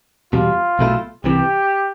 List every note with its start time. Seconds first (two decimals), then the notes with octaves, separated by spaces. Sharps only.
0.33 E2 B2 G3 F4
0.79 B1 B2 A3 E4
1.24 C2 C3 E3 G4